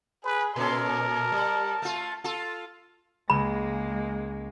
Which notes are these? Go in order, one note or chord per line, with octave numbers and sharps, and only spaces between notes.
G#4 B4
A#2 C#4 A4 A#4 C6
A5
G3
A3 F4
F4 A4
C#2 G#3 A#3 D#5 B5